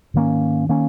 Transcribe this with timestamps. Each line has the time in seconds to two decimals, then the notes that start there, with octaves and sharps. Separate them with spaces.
0.14 G#2 D#3 A#3 C#4
0.69 D#3 A#3 C#4